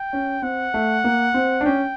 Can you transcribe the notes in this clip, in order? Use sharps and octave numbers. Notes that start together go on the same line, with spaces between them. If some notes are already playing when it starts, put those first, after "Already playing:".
Already playing: G5
C#4
C4 F#5
A3
A#3
C4
D4
C#4 G5